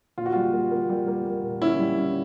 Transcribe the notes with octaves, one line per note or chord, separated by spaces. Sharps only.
A#2 F4
F#4
G3 F4
A#3
A#3
G3
A#3
A#3
A#2
C#4 E4
G3
C#4